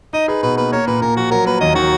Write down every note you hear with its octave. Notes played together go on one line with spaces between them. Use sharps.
D#4 D#5
G#4 B4
B2 B4
A#3 B4
A#3 C#5
A#2 B4
A#2 A#4
F3 F#4
F#3 A#4
A#3 B4
D#2 D#5
D#3 F#4